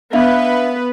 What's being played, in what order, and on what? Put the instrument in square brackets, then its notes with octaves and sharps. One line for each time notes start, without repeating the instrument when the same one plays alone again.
[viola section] B3 B4 [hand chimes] D4 E5 F5